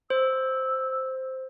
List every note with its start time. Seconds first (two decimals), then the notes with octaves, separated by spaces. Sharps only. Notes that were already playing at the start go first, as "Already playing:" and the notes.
0.10 C5 E6